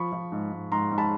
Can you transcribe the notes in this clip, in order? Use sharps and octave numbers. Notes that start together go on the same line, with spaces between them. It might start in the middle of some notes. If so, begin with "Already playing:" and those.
Already playing: F3 B5 C#6
F3
G#2
G#2
G#2 A#5 C6
G#2
A5 B5